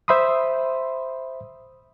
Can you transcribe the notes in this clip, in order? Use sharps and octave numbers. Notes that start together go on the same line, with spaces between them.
C5 E5 B5 C6 D#6